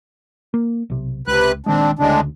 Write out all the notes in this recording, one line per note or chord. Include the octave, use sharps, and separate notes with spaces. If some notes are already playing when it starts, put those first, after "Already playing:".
A#3
B1 C3
C#2 C3 B4 F#6
A#1 D#3 G#3 C4 D4
D2 A2 C#3 G#3 D4